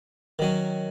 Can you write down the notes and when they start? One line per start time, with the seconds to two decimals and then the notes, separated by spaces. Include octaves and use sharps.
0.39 D#3 F#3 C#4